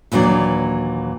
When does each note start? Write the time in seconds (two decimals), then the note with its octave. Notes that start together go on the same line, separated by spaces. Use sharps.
0.12 D#2 A#2 E3 F#3 D4